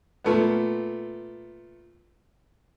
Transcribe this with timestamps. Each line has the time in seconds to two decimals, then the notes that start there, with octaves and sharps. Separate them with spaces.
0.24 A#2 A3 B3